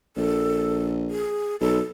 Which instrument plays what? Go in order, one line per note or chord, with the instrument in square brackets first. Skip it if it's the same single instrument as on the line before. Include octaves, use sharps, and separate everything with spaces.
[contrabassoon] A#1 [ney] A4
[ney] G#4
[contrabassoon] B1 [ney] A4